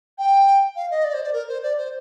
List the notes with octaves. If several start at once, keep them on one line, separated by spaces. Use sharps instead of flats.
G5
F5
D#5
D5
C5
D5
A#4
C5
D5
C5